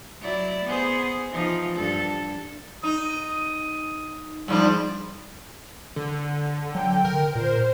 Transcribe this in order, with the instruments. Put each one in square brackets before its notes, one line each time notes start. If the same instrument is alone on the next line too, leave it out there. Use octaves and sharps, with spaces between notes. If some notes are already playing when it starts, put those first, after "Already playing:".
[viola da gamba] F#3 E4 D5
B3 G#4 C5
E3 F3 D#4
G2 A4
[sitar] D#4 [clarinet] D#6
[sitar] G#2 F3 D4 [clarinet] G3
[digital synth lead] D3
[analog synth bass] F#3 [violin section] G5
[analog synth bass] D3 [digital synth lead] A#4
[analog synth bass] A#2 [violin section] C5